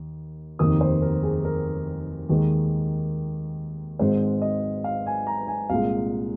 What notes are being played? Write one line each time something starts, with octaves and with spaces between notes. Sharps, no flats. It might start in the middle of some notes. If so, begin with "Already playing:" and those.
Already playing: D#2
F1 D#2 D#3 D#6
C5
A#4
G#4
A#4
D#2 D#3 G#3
G#1 G#2 G#3 C5
D#5
F5
G#5
A#5
G#5
C2 A#2 G#3 F5